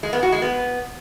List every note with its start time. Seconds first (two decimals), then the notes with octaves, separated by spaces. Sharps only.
0.03 G#3
0.13 B3
0.23 F#4
0.32 G#3
0.42 B3